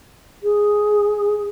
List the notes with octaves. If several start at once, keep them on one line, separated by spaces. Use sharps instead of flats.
G#4